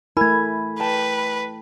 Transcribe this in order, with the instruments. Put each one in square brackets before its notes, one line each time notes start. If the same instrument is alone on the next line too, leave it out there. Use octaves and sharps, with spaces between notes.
[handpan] A3 E4 [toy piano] A#4 B5 [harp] G#5 G#6
[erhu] B4 [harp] G5 A5